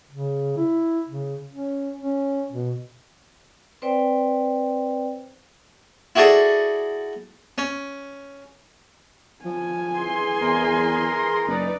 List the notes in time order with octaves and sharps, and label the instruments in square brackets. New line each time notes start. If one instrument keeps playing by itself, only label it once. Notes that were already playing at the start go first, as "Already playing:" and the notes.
[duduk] C#3
E4
C#3
C#4
C#4
B2
[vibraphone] C4 B4 C5 D5 G5
[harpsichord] E4 F#4 G#4 A4 D5
C#4
[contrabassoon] F3 [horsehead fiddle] G#5
[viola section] E3 G#4 C6
[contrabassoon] E2 [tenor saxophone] A#4
[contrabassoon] F#1 [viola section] D#4 B4 D5